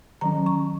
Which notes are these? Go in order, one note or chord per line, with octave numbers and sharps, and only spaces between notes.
D#3 F#3 C#4 A#5
C#6